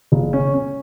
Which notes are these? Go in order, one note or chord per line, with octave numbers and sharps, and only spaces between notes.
F#1
C#4
C#4